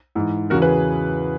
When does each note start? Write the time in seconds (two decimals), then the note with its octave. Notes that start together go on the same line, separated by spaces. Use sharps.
0.15 G#2 E3
0.50 E2 C#3 E3 F#4 A#4
0.62 G#4 B4